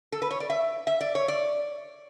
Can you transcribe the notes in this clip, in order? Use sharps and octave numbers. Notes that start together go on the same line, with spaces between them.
A4
B4
C#5
D5
E5
E5
D5
C#5
D5